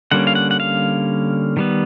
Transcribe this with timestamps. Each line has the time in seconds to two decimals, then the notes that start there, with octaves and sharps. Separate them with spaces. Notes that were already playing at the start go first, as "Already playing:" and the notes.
0.11 D3 G3 A#3 C#4 F#5
0.27 F5
0.35 F#5
0.51 F#5
0.60 F5
1.57 D#3 G3 B3